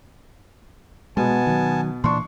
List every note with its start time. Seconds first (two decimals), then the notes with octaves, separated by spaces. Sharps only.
1.17 B2 G#3 B3 G#5 A5
1.47 D#3 F#3
2.04 A#2 E3 A#3 D4 C6 C#6